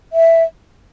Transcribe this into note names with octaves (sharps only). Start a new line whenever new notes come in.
E5